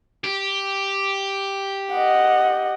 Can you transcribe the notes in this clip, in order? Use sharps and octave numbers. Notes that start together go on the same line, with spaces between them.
G4
D#5 F#5